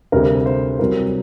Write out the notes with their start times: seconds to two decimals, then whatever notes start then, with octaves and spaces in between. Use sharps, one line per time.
0.12 D2 C3 G3 A#4
0.46 C5
0.79 C2 C3 F#3 A#4